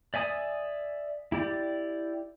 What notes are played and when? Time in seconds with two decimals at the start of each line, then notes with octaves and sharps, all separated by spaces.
0.14 D5 E5 G#5 D#6
1.32 E4 G4 D5